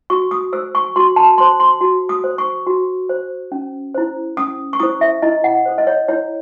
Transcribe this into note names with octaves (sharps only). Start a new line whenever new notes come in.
F#4 C#6
D#6
A4 C5 E6
C#6
F#4 C6
A5
A4 C5 C6
C6
F#4
D#6
C5
C#6
F#4
C5
C#4
E4 C5
C#4 D#6
C#6
E4 C5 D#6
E5
E4 D#5
F#5
A4 C5
D#5
C#5
E4 C#5